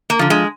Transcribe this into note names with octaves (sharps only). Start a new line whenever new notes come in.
A#3
D3 F3
G#3